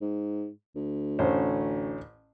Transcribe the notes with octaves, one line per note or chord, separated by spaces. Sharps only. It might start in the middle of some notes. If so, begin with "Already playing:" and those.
G#2
D2
A1 C#4 C5